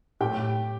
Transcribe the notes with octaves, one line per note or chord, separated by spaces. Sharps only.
A2 G4 G5